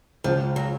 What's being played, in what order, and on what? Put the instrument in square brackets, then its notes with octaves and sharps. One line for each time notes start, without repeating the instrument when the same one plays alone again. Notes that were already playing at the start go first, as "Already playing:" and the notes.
[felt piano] C#2 [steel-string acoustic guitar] F3
[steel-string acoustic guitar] F#3